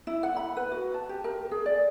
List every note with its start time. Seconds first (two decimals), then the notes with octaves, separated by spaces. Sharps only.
0.07 E4
0.23 F#5
0.36 B5
0.57 B4
0.72 F#4
0.94 A5
1.09 G4
1.24 A#4
1.51 G#4
1.66 D5